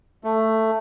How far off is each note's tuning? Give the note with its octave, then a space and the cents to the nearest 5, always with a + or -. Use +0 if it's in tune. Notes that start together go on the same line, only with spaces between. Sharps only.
A3 +10